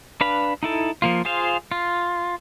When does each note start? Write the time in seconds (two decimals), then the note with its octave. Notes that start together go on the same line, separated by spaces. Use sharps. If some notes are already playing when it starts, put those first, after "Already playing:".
0.21 D4 B4 F5 B5
0.63 D#4 E4 A4
1.02 F3 A#3 F4
1.25 F4 G#4 C5 F5
1.72 F4